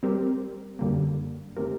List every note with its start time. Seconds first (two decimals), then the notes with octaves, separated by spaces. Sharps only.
0.03 G3 C4 G4 A#4
0.79 F#2 D3 G3 A#3
1.57 D#3 A3 C4 G4 A#4